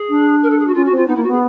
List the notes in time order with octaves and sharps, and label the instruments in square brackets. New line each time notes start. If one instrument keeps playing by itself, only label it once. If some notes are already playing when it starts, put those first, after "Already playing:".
Already playing: [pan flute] G#4
[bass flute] D4
[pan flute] A#4
A4
G#4
F#4
[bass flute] C#4 [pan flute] F4
[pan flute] F#4
[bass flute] C4 [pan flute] F4
[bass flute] B3 [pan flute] D#4
[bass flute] A#3 [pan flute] E4
[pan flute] F#4
[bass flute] B3
[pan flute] G#4